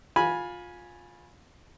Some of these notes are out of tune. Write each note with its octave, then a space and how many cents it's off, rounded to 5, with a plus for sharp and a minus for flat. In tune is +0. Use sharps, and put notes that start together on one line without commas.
F4 +20 G#5 +0 B5 -15